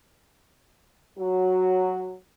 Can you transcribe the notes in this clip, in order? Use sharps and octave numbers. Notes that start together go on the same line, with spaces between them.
F#3 F#4